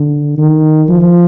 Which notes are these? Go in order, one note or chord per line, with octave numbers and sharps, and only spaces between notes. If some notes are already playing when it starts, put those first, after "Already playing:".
Already playing: D3
D#3
F3